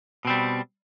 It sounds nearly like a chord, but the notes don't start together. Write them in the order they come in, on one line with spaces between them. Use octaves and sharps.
B2 C4 G3